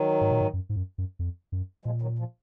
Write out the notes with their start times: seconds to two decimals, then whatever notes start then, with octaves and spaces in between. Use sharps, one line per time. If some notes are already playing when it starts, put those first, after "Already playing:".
Already playing: D#3 F#3
0.21 G#2
0.31 A#2
0.41 G#2
0.53 F#2
0.69 G#2
0.76 F#2
0.98 F#2
1.19 F2
1.52 F#2
1.85 A#2 F3 G#3
2.02 D#3 F#3
2.19 F3